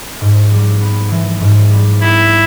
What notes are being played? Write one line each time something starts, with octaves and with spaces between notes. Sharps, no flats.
G#2
G3
B3
E3
G#2
G3
B3 E4